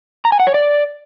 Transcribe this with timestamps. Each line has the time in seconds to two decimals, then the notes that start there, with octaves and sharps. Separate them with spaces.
0.25 A#5
0.32 G#5
0.40 F#5
0.47 C#5
0.54 D5